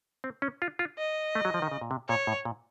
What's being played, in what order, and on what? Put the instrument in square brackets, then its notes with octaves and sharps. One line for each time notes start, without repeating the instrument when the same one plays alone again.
[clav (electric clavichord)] C4
C#4
F4
F4
[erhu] D#5
[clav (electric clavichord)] A3
F#3
F3
D#3
C#3
A#2
C3
[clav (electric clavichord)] A#2 [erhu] C#5
[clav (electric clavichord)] A2
A#2